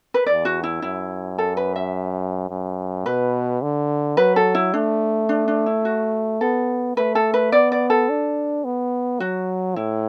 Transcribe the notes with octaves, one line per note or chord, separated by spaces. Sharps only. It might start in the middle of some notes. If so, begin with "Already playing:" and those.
B4
E2 D5
F#4
E4
F#2 E4
A4
B4
E5
F#2
B2 B4
D3
F#3 B4
A4
E4
A3 D4
D4
D4
E4
F#4
B3 A4
A3 B4
A4
B4
B3 D5
D5
A4
D4
B3
F#3 F#4
A2 E4